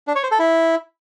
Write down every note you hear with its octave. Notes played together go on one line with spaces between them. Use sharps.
D4
C#5
C5
A4
E4